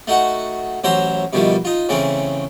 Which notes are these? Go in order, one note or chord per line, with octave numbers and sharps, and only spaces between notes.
A3 D#4 F#4 F#5
A1 F#3 C5 E5 A#5 C6
G2 B2 D#3 F3 G3 A3
D#4 F4
C#3 E3 A3 C4 C#4